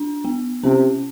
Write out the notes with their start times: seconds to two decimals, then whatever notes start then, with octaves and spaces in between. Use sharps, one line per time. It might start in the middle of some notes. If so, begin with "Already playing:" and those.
Already playing: D4
0.25 B3
0.63 C3 C#4